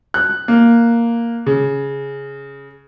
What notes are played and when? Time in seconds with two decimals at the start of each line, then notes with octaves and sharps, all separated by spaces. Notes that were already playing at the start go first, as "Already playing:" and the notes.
0.14 F#6
0.48 A#3
1.46 C#3